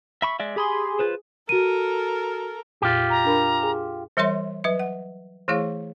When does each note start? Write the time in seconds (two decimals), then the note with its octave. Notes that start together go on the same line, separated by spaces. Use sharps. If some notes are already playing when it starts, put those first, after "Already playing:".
0.22 E5 B5 C#6
0.40 G#3 D5 E5
0.56 G4 G#4 B5 C6
0.99 F4 B4 C5
1.49 F#4 A4 A#4 D#7
2.82 F2 A#2 F4 G4 F#6
3.10 A#5
3.25 D4 A#4 B5
3.63 G#4 G#5
4.17 E3 G3 A#4 C#5 E5 C6
4.64 F#3 B4 E5
4.79 F#5
5.48 E3 A3 E4 G#4 C#5 F5